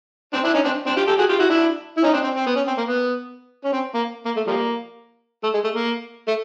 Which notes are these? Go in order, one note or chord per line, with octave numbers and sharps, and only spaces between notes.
C4 D4
D4 E4
C#4 D#4
C4 D4
C4 D4
F4 G4
G4 A4
F#4 G#4
F4 G4
E4 F#4
D4 E4
E4
C#4 D#4
C4 D4
C4
C4
B3
C#4
C4
A#3
B3
C#4
C4
A#3
A#3
A3
F3 G3 A#3
A3
G#3
A3
A#3
A3